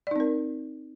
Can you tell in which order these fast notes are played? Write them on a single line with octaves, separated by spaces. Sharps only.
D5 D#4 C4 A#4